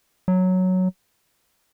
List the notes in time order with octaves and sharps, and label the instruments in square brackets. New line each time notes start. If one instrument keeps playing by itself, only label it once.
[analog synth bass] F#3